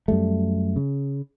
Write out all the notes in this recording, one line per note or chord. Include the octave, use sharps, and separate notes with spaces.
F#2 G3 A3
C#3